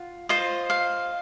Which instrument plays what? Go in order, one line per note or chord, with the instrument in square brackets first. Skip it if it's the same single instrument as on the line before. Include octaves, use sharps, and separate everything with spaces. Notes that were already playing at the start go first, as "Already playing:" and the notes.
Already playing: [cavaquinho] F4 F#5
F4 C5 D#5
F5